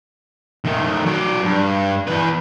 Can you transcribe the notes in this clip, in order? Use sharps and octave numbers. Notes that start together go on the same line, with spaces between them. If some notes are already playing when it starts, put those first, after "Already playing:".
D#3 A3
F#3 D5
G2
E2 B4